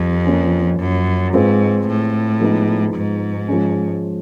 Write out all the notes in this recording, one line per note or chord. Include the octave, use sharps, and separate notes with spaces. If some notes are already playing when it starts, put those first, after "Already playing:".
Already playing: F2 G3
F3 A#3 C#4
F#2
G#2 G#3 C4 F4 G#4 B4
A2
F3 G#3 B3 D#4
G#2
F3 G#3 C#4